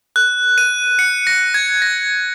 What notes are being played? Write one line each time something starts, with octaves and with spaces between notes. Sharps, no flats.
F#6
D#7
C#7
A#6
G#6
A#6